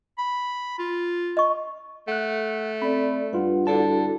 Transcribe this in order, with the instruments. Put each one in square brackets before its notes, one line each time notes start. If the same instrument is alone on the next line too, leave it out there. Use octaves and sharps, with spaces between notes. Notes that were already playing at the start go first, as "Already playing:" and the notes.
[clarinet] B5
F4
[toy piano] D#5 C#6
[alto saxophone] A3 [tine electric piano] F#5 F#6
[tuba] C4 [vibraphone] A4 D5 [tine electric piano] B5
[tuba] G2 [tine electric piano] F4 B4 [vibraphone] F#5
[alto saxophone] D3 [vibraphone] E4 F#4 A4 [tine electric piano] A5